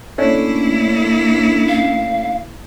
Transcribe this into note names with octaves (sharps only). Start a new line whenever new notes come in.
A3 A#3 C#4 D4 E4
F5